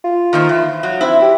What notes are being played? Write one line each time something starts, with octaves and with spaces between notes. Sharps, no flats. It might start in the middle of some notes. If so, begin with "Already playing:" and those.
F4
D#3 A#3 C5
E3
F#3
C4 E4
G4